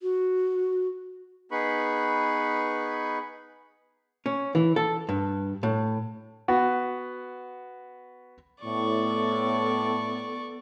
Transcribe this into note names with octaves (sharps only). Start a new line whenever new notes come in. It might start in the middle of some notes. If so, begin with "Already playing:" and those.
F#4
B3 D#4 G#4 B4 B5 C#6
C#4
E3
A4
G2
A2
B3 F#4
A2 B3 A4 D5 C#6